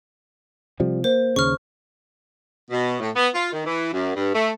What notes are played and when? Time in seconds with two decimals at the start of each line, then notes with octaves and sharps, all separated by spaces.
0.80 C3 F3 G3
1.04 A#3 C5
1.36 D#2 C#3 C#6 F6
2.71 B2
3.00 A2
3.15 B3
3.34 F4
3.52 D#3
3.66 E3
3.92 F#2
4.15 G2
4.34 A3